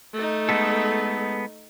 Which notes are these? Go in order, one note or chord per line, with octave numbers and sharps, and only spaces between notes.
A3 D#4
G#3 B3 A4